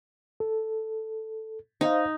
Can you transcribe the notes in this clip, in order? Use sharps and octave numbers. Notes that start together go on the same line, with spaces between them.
A4
D#4 C5 D#5 F5